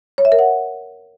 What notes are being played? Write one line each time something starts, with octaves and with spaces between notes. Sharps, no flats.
C#5
E5
A#4
F#5